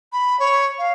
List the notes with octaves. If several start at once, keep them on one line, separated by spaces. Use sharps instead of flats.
B5
C#5
F5